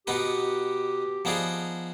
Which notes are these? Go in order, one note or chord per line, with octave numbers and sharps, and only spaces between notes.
B2 B3 D#4 G4 B4
F3 B3 D#4 G#4 D5